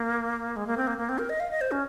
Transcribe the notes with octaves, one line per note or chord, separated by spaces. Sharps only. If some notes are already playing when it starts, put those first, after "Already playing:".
Already playing: A#3
G#3
A#3
C4
A#3
A#3
C4
A#4
D#5
F5
D#5
C5
C#4